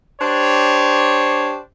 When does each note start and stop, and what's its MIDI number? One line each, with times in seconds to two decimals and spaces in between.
0.20 1.58 62
0.20 1.58 67
0.20 1.58 72
0.20 1.58 73